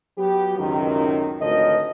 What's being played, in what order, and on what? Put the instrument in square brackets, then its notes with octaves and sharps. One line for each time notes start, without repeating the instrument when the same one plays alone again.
[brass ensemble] F#3 B3 G4
C#2 F#2 A2 C3 D#3
G#1 D2 F3 A#4 C#5 D#5